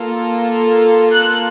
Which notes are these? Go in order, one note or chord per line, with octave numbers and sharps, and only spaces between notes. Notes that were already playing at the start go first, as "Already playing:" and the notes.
Already playing: A#3 F4 A4
F#6